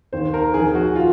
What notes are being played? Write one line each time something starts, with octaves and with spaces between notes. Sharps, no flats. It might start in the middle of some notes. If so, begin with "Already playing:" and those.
D#2 D#3 C5
A#4
F2 D#3 G#4
F#4
F4